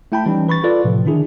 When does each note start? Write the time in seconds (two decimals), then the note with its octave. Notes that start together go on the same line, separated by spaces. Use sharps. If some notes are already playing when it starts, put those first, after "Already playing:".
0.12 A3 E4 G5 A5 B5
0.26 E3 G3 C#4 D#4
0.48 B4 B5 C#6 A6
0.64 F4 A4 B4 D5
0.84 A2 C3 F3
1.05 D3 D#3 D4 E4 G#4